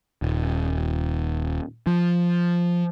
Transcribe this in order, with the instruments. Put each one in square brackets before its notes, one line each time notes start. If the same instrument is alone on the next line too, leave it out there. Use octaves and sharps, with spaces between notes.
[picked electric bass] D#1
F3